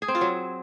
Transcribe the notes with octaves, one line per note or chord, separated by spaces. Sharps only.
G#4
C4
F4
F#3